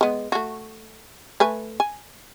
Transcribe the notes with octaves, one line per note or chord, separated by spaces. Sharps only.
G#3 B3
A3 F#4
A3 B4 G#5
G#5